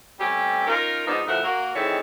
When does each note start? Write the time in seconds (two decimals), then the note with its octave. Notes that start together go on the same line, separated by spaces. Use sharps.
0.20 G3 A3 C4 C#4 G4
0.67 C#4 D#4 F4 A#4
1.07 G#2 F3 B3 D4 D#4
1.27 D2 A2 F3 A#4 E5 F#5
1.44 A#3 F#4 A#4
1.76 D#3 E3 G#3 C4 A4 C#5